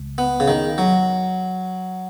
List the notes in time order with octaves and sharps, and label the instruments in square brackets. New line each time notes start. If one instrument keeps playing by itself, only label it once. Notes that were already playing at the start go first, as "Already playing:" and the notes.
Already playing: [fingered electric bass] C#2
[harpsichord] B3
C#3
D#3
F#3